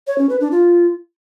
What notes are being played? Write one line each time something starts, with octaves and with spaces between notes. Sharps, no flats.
C#5
C#4
B4
D4
F4